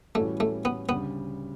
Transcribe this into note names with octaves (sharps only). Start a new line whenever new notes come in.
A2 E3 G3 A3 C#4 F#4
A3
B3
D2 C#3 G3 B3